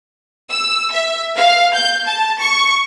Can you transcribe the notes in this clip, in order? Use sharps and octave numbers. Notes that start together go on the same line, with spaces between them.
E6
E5
F5
G6
A5
C#6